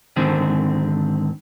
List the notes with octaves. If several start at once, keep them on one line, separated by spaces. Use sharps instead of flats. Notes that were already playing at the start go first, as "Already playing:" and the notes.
G#2 D3 D#3 C4